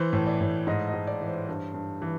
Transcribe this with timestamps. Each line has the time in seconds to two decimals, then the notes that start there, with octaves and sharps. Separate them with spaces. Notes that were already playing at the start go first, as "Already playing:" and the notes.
Already playing: E3 C5
0.13 A2
0.27 D5
0.41 A2
0.67 G#2 D#5
0.87 D#5
0.93 G#2
1.07 D5
1.22 E3
1.27 C5
1.48 G2
1.74 G2
2.02 E3